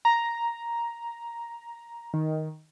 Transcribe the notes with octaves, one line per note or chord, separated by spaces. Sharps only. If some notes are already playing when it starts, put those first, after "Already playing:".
A#5
D#3